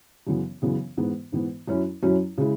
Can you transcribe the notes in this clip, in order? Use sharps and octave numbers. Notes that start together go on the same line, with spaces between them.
F#2 C#3 E3 B3
F#2 C#3 E3 B3
G#2 E3 B3
G#2 E3 B3
F#2 F#3 C#4 E4
F#2 F#3 C#4 E4
C#3 G#3 E4